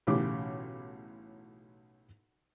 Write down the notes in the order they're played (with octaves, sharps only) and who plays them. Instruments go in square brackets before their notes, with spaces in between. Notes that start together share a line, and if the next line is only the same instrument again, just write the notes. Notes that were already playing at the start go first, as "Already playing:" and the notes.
[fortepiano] B1 A2 C#3 E3 G4 D6